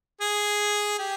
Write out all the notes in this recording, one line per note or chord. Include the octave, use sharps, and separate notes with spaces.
G#4
G4